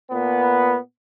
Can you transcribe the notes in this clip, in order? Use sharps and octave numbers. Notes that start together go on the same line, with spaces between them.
A#2 B3